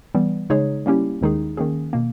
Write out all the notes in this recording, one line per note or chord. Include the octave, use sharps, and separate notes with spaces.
E3 G3 B3
C#3 G#3 D#4 G#4 C#5
G3 A#3 C#4 E4 G4
D#2 D#3 G#3 D#4 G#4
D#3 A#3 C#4 G#4
B2 A#3